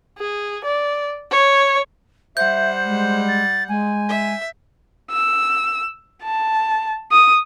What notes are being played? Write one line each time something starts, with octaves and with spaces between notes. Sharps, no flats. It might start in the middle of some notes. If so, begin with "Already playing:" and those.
G#4
D5
C#5
G3 C5 E5 F#5 G6
G#3
A6
G#3 G#5
E5
E6
A5
D#6